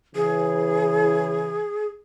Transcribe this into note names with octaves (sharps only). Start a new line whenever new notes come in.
C#3 E3 G#4